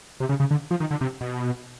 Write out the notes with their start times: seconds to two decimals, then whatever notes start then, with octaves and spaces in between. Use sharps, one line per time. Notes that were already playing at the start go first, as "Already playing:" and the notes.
0.20 C3
0.29 C#3
0.40 C#3
0.51 D3
0.71 F3
0.80 D#3
0.91 D3
1.01 C3
1.21 B2